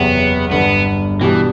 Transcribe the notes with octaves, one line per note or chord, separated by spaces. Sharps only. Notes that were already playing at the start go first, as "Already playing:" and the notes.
Already playing: F#1 E2 C3 F#3 B3
G1 G2 D3 B3
B2 E3 G3 B3 D4 G4